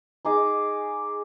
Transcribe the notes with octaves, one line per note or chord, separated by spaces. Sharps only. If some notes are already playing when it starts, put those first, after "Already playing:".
D#4 G#4 D6